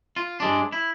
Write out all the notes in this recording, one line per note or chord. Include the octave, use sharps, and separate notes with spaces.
F4
G2 G#3 D4
E4